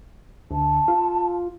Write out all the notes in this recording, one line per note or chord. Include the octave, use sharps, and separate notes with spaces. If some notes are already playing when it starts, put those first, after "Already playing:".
D2 A5
F4